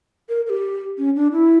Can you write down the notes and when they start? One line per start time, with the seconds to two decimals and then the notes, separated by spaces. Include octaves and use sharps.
0.29 A#4
0.46 A#4
0.50 G4
0.98 C#4
1.16 D4
1.32 E4